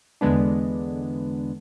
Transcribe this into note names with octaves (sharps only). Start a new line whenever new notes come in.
E2 D3 G#3 B3 D4